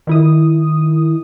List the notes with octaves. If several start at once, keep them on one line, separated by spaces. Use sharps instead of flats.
D#3 E4 D#6